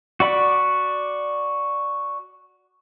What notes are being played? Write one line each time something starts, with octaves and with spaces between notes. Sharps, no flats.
F#4 D5 B5